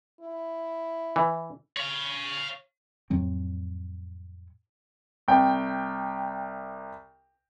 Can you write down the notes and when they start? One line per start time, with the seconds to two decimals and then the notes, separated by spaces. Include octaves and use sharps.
0.21 E4
1.16 E3
1.77 C#5 F5
3.10 F2 A2 F#3 C4
5.28 C2 G5